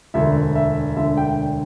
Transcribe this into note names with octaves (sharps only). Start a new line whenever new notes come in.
E1 D2 D3 E5
E5
E1 D2 D3 E5
G5